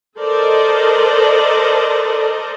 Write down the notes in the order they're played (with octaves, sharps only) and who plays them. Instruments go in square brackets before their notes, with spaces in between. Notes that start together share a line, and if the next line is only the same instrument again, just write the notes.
[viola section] A4 A#4 C5 D5 D#5